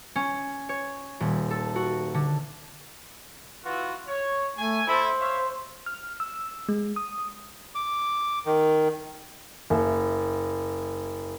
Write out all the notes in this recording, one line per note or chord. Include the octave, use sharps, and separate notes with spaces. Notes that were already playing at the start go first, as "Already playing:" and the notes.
C#4
C#5
D#1
A4
F#4
D3
E3 F4 F#4
C#5
A3 G#5
E4 A4 C5
C#5 E5 F5
F6
E6
G#3
D#6
D6
D#3
F#1 E5